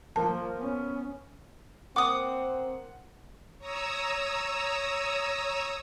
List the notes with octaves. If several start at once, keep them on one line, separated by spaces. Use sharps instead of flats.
F3 A#3 A#4 A5
B3 C#4
A#3 C4 F#5 D6 D#6
C#5 A#5 D#6 E6